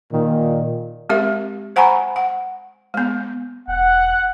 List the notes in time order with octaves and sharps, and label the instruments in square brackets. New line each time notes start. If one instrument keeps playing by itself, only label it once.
[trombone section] A#2 D#3
[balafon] G#3 C4 G4 A#4 E5
C5 F#5 G#5 A#5 B5 C#6
F#5
G#3 B3
[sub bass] E1 [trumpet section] F#5